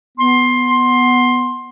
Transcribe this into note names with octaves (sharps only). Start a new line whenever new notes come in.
B3 C6